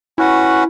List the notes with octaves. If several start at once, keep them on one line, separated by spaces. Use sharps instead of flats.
C#4 E4 F#4 B4 F#5